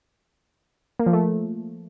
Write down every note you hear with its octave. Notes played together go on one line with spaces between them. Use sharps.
A#3
F3
A3